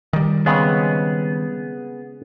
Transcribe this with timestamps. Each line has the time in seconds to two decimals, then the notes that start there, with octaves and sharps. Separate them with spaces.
0.13 D#3 G3
0.46 C#3 G#3 B3 C4 G#4